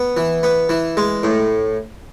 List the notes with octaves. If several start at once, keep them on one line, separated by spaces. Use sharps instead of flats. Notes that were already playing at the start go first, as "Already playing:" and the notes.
Already playing: B3
E3
B3
E3
G#3
A2